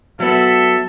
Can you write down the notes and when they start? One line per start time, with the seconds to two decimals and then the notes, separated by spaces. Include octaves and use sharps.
0.20 F#3 B3 A4 E5